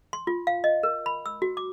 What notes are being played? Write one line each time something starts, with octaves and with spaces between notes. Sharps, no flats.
C6
F4
F5
D#5
A#4
B5
E6
F#4
D6